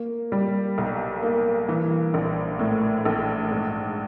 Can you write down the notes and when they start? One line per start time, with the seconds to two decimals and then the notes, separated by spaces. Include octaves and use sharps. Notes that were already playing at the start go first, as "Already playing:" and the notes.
Already playing: A#3
0.32 G3
0.78 B1
1.23 A#3
1.69 E3
2.14 A#1
2.59 A2
3.05 A#1
3.51 G#2